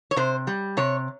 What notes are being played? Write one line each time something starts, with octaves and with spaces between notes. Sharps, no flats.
C#5
C3 C5
G3
C3 C#5